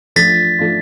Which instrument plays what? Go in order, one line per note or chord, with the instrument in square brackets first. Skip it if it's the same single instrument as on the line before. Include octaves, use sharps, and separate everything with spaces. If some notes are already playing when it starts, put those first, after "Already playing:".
[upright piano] F3 A3 D4 F4 [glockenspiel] A6 B6
[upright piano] F3 A3 D4 F4